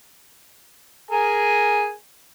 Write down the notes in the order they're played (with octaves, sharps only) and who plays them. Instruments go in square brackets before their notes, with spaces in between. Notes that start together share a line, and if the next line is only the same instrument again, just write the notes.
[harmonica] G#4 A#4 G#5